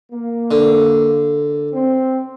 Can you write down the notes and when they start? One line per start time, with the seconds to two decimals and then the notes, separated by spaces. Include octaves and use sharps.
0.12 A#3
0.51 D3
1.72 C4